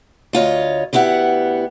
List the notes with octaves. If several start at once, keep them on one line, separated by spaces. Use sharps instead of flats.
D2 F4 C#5 D#5
D2 B3 E4 G4 F#5